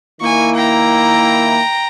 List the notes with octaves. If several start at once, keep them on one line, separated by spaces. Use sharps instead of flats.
D#3 A#3 E4 G#5 C#6
G5 A#5